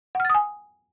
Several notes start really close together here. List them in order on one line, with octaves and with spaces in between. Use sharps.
F#5 F6 A6 D#6 G#5